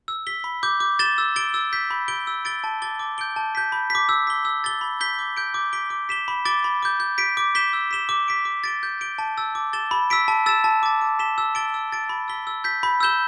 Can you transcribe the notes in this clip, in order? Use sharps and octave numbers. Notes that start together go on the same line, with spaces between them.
E6
B6 G7
B5
D6 G6
D6
A6 E7 G7
E6
A6 D7 G7
E6
G6 B6
B5
G6 D7 G7
E6
A6 D7 G7
A5
D6 A6 G7
D6
G6 D7 G7
A5
G6 B6
B5
D6 B6
E6
B6 G7
E6
A6 G7
B5
G6 B6 G7
D6
G6 D7
D6
B6 D7 G7
D6
B6 E7 G7
B5
D6 A6 D7 G7
B5
D6 G6
G6
B6 D7
D6
G6 B6 E7 G7
E6
B6 E7 G7
D6
B6 D7
D6
A6 D7 G7
G6
D7 G7
A5
E6 A6
D6
A6 E7 G7
B5
E6 B6 D7
A5
E6 A6 E7
A5
D6 A6
D6
B6 E7 G7
E6
A6 D7 G7
E6
A6 D7
B5
E6 B6 G7
E6
G6 B6
B5
E6 G6 E7 G7